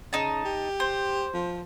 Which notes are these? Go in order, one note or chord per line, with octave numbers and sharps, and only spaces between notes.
C#3 D#4 A5
G4
C5
F3